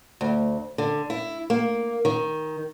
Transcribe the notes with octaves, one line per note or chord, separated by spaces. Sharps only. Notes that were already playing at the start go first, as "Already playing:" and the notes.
D2
D3
E4
A#3
D#3